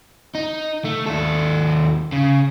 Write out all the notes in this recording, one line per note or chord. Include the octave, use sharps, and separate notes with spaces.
D#4
A3
D#2 A4
C#3